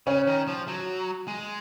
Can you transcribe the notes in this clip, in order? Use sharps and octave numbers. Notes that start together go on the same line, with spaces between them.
C#3 C#4
D#3
F3
F#3
G#3